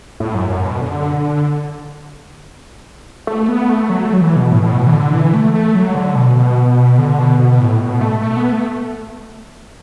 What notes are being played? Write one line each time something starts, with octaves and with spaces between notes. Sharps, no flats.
A2
F#2
F#2
B2
D3
A3
B3
A3
F#3
A3
F#3
E3
B2
A2
A2
B2
E3
D3
E3
A3
A3
F#3
D3
B2
B2
D3
B2
B2
A2
B2
A3
A3
B3
A3